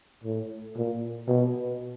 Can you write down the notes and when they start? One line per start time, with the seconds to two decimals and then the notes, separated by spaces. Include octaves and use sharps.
0.24 A2
0.77 A#2
1.28 B2